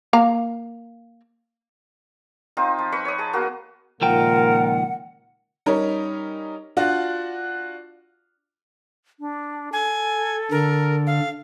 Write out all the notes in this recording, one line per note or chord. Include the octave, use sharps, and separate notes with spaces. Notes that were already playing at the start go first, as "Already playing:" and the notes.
A#3 F5 A#5
C4 D#4 F4 D#5
F3
B4 D#5 B5 C#6
C#5 D#6
G#4 A5
A#3 B3 F#4
C#2 A#2 D#3 F3 F4 A#4 F#5 G5
G3 C#4 D#4 A#4 C#5
D4 F4 F#4
D4
A4 G#5
D3 A#4
F5